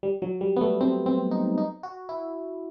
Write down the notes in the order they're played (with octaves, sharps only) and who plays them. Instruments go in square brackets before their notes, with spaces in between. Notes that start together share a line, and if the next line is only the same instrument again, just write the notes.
[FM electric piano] G3
F#3
G3
B3
A3
C4
C4
D#4
D#4
F#4
E4